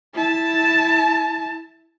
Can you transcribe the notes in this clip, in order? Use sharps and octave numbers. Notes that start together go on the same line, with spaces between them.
E4 A5